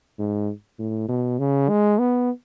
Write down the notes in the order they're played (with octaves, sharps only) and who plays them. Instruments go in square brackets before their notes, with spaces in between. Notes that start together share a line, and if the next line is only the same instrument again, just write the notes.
[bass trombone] G#2
A2
B2
C#3
G#3
B3